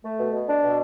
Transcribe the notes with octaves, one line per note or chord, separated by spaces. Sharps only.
A3
B2
B2
D4
B2